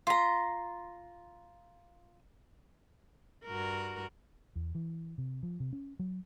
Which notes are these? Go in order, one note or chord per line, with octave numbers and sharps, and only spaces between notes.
F4 A#5 C6 B6
G2 F#4 A#4
E2
E3
C3
F3
C3
C#4
F#3